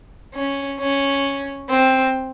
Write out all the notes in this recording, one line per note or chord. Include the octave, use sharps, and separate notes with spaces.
C#4
C#4
C4